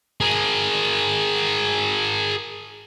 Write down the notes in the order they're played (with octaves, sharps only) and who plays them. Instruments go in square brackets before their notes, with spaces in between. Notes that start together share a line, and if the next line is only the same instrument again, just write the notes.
[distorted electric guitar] G#4 A#4